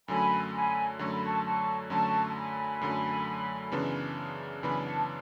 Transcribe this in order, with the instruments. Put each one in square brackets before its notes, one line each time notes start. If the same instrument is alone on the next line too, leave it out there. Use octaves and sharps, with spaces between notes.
[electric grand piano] F#2 D3 F#3 A3 [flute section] G#5 B5
[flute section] G#5 B5
[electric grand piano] F#2 D3 F#3 A3 [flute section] C#6
[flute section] B5
A5 C#6
A5 C#6
[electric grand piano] F#2 D3 F#3 A3 [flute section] A5 C#6
[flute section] A5
G#5 B5
[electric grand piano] F#2 D3 F#3 A3
F#2 C#3 E3 B3 D4
[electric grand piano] F#2 C#3 E3 B3 D4 [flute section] G#5 B5
[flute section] F#5 A5